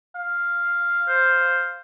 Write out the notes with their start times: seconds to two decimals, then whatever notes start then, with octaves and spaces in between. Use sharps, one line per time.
0.16 F5
1.08 C5